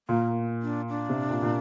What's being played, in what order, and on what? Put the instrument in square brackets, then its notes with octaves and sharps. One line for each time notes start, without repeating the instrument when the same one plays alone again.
[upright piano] A#2 [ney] A#3
[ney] D4
D4
[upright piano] C3
A#2
A#2